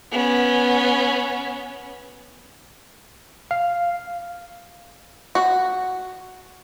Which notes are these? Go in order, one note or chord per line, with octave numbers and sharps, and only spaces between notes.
B3 C#4
F5
F#4